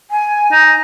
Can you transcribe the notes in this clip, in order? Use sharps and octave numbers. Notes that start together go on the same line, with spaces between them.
G#5
D#4